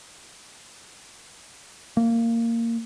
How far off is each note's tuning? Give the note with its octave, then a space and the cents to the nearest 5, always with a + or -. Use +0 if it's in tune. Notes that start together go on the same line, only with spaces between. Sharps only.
A#3 -15